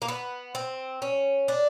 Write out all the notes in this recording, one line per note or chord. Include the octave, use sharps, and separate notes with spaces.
A#3
B3
C4
C#4
D4